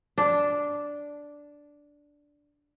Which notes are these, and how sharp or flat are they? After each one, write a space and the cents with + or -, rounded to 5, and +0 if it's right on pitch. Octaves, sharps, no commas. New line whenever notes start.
D4 -5